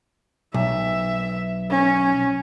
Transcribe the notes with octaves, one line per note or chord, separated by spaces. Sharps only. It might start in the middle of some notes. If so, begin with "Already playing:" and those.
B1 E5
C#4